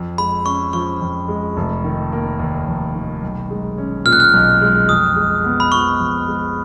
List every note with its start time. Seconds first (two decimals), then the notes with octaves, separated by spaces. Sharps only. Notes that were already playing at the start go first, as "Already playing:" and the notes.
Already playing: F2
0.18 G#3 B5
0.45 C#4 C#6
0.73 F3 C#6
1.01 F2
1.28 G#3
1.57 F1
1.84 D#3
2.12 A#3
2.39 D#2
2.67 F1
2.95 D#3
3.23 B1
3.50 G#3
3.78 C#4
4.05 A#2 F6
4.13 F#6
4.20 F6
4.33 B1
4.62 G#3
4.89 F2 D#6
5.16 G#3
5.44 B3
5.60 B5
5.72 F3 C#6
6.00 F2
6.28 G#3